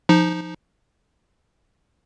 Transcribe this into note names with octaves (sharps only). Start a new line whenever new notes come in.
F3 D#4